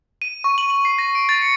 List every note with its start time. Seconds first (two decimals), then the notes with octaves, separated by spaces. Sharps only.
0.22 D#7
0.44 C#6
0.58 F#7
0.70 F#7
0.85 C7
0.99 A#6
1.15 D7
1.29 A6
1.42 C#7